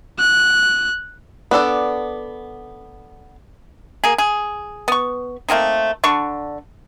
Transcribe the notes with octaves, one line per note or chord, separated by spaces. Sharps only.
F#6
B3 D4 A4 D5
A#3 G#4
G#4
B3 C#6
A3 A#3 C4 D#4
D3 D4 C#6